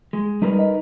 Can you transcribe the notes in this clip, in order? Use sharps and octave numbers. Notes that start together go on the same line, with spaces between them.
G#3
G3 D#4 A#4 B4
D#5